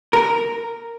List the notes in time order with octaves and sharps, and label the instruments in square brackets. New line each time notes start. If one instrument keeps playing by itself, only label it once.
[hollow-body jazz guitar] A#4